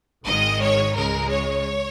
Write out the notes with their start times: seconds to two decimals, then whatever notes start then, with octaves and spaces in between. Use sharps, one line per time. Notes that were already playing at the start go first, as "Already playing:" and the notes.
0.25 G#1 G#2 D#3 G#3 D#5
0.61 C#5
0.95 C#2 C#3 G#3 A#4
1.30 C#5